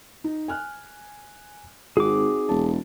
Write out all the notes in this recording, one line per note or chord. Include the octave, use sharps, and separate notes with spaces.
D#4
G#5 F6 F#6
G#1 C4 D#4 F#4 G#4 D6
E1 A5